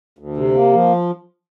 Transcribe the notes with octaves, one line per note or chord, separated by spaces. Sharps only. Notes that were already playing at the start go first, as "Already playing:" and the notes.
D2
C3
A#3
F3